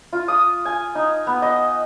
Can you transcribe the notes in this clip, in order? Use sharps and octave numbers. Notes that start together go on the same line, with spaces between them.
F4
D#6
G#5
D#4
B3
D#5